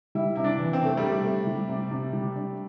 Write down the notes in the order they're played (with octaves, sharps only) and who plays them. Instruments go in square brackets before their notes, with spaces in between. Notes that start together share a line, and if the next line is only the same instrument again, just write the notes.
[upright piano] G3 [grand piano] E4
[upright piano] C3 [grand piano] E4
[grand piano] D4
[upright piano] E3
[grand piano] C4
[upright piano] C3 [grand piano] A3
[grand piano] G3
[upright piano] C3
[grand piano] A3
[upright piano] C3
G3
C3
C3
G3
D4